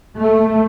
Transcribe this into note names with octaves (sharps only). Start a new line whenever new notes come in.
A3